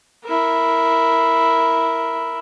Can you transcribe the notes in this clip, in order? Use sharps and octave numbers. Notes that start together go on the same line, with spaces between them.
E4 A#4